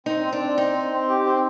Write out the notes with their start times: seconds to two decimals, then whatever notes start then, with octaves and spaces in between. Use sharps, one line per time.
0.06 C4 D#4
0.23 C4
0.33 D4
0.41 C4
0.58 C4 D#4
0.74 C4
0.92 C4
1.09 G4
1.26 C4